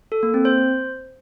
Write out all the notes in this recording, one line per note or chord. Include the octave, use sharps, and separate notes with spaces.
A4
A#3
C4
C5